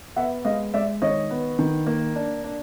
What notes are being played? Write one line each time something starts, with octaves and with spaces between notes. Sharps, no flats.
B3 E5 F#5
G#3 D#5 F5
G#3 D5 E5
D#3 C#5 D#5
B3
D#3
A#3
D4
D4